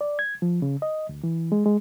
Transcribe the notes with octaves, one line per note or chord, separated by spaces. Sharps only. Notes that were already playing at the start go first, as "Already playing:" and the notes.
D5
G#6
F3
C#3
D#5
D2
E3
G#3
G#3